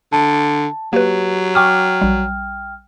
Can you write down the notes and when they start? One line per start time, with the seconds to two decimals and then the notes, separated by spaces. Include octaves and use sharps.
0.12 D3 A5
0.93 F#3 A#3 G4 B4
1.55 G5 G#5 C#6 D6 F6
2.01 A#1 G3